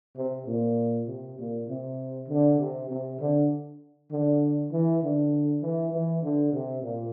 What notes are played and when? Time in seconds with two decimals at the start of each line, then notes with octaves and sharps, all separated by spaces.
0.16 C3
0.46 A#2
1.07 C3
1.37 A#2
1.67 C3
2.28 D3
2.59 C3
2.88 C3
3.19 D3
4.10 D3
4.71 E3
5.01 D3
5.61 E3
5.92 E3
6.22 D3
6.52 C3
6.82 A#2